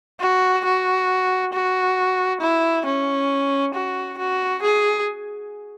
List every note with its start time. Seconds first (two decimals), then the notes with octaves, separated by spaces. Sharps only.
0.21 F#4
0.65 F#4
1.53 F#4
2.41 E4
2.86 C#4
3.74 F#4
4.18 F#4
4.62 G#4